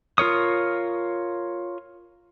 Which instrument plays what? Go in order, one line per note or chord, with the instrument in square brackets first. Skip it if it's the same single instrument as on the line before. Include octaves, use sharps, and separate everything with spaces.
[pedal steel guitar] F4 A#4 C#5 D#6